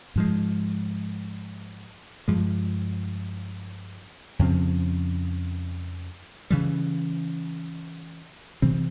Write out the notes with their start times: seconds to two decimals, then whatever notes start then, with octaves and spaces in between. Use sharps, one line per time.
0.16 G#2 F3 G#3
2.28 G2 F3 G#3
4.39 F2 C#3 F3 C4
6.50 C#3 E3 G3
8.62 C3 E3 G3 C4